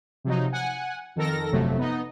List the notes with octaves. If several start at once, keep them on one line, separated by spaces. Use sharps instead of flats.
C3 F3 F#3 D#4
F#5 G#5
F2 D#3 A4 A#4 A#6
G1 F2 C3 F#3 A3
B3 D#4 D#5